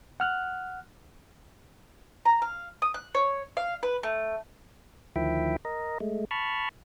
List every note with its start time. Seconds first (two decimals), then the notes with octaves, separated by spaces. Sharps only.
0.20 F#5 F6 F#6
2.25 A#5
2.42 F5
2.82 D#6
2.94 F#6
3.15 C#5
3.57 F5
3.83 B4
4.03 A3
5.16 D2 D#3 F3 E4 E5 G5
5.65 A#4 D#5
6.00 G#3 A3
6.31 A5 B5 C#6 F6